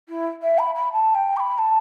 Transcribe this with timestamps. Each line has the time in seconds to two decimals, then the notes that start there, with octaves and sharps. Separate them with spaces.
0.08 E4
0.42 E5
0.58 B5
0.75 B5
0.92 A5
1.14 G5
1.36 D6
1.40 B5
1.58 A5